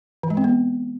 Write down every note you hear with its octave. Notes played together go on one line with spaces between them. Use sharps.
E3
G#3
C4
B3